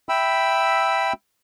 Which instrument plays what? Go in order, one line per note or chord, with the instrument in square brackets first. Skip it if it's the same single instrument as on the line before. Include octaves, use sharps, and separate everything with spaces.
[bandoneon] E5 G5 B5 E6